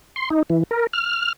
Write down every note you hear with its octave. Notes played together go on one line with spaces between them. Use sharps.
C6
D#4
E3
A#4
F6